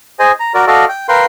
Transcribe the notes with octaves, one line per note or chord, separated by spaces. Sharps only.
G#4 C5 D#5 G#5
A#5
F#4 A#4 D5
F#4 A4 D5 D#5 F5
G5
A#4 B4 F5 G5 C6